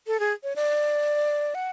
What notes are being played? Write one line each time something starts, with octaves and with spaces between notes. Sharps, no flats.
A4
G#4
C#5
D5
F#5